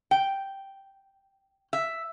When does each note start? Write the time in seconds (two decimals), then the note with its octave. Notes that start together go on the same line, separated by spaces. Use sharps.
0.11 G5
1.73 E5